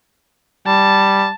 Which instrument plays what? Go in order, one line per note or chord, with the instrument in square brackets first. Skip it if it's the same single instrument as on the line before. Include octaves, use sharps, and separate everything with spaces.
[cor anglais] G3 [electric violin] A5